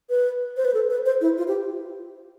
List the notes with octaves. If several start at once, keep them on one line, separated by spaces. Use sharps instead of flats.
B4
C5
B4
A4
B4
C5
E4
F4
G4